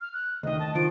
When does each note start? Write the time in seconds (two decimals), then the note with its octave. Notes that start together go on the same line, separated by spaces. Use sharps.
0.01 F6
0.14 F#6
0.43 D2 D#3 D#5
0.59 A5
0.75 D#3 F3 D7